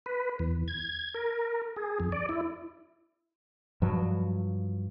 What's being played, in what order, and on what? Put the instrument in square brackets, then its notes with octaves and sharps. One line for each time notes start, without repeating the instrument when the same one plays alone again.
[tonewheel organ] B4
E2
G#6
A#4
G#4
F2
D5
E4
[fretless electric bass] G2 F3 F#3